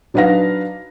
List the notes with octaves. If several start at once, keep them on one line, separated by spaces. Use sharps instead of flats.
F#3 D4 D#4 B4 F5 A#6